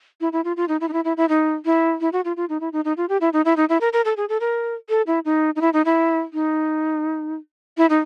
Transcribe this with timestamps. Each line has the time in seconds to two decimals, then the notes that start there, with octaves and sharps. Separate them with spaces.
0.21 E4
0.33 E4
0.44 F4
0.57 F4
0.68 D#4
0.81 E4
0.88 D#4
0.93 E4
1.05 E4
1.17 E4
1.29 D#4
1.65 E4
2.01 E4
2.12 F#4
2.25 F4
2.37 F4
2.49 D#4
2.60 E4
2.73 D#4
2.85 D#4
2.97 F4
3.09 G4
3.21 E4
3.33 D#4
3.45 E4
3.57 D#4
3.69 E4
3.81 A#4
3.93 A#4
4.05 A4
4.17 G#4
4.29 A4
4.40 A#4
4.89 A4
5.07 E4
5.25 D#4
5.56 D#4
5.61 E4
5.73 D#4
5.85 E4
6.33 D#4
7.77 E4
7.90 D#4